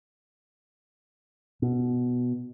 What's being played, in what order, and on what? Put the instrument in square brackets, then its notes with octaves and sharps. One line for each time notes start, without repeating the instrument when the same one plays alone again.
[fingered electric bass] B2